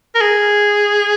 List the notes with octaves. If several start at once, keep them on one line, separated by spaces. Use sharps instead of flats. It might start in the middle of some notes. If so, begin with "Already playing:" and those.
A#4
G#4